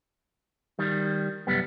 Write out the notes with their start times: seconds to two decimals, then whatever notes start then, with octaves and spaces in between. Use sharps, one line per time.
0.79 D#3 G3
1.47 C2 F#2 G3 B3